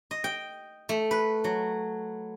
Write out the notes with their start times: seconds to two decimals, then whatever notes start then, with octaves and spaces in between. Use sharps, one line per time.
0.11 D#5
0.24 G5
0.89 A3
1.11 B4
1.44 F#3